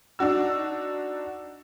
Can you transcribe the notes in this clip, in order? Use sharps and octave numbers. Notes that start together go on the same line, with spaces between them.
D4 D#4 F#4 E6